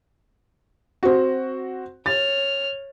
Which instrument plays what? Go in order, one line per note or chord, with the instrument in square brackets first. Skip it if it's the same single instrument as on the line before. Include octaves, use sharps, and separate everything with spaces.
[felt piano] C4 F#4
[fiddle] C#5 F6 [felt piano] A6